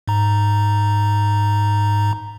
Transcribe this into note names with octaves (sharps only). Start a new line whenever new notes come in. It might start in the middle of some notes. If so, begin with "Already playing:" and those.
G#2 A#5